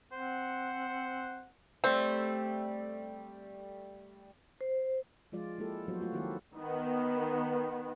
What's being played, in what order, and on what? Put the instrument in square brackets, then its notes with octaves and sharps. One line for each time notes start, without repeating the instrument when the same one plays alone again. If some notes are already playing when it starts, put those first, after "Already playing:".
[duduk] C4 [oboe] C5 [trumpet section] F#5
[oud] G3 A3 [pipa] C4
[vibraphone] C5
[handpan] F3 G#3 F4 D5
G#3 A#3 E4 G4 A4
F3 F#3 B3 F#4 C5
A3 F4 F#4
D#3 A#3 C4 E4 G4 A4
[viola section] D#3 B3